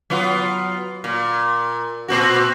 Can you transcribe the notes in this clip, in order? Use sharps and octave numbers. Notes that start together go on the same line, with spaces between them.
F#3 B3 F4
A#2
A#2 C4 F#4